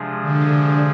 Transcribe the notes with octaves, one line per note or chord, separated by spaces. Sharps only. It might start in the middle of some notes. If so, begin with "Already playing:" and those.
Already playing: C3 F3 G#3 D4 G#4
D3